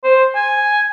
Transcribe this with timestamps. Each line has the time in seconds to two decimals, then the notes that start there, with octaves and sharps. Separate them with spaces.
0.04 C5
0.35 G#5